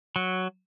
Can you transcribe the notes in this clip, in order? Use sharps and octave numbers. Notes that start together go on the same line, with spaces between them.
F#3